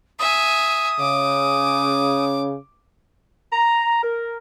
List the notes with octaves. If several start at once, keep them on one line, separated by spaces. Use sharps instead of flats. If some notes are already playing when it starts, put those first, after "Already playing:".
E5 G#5 D#6
C#3 D6
A#5
A#4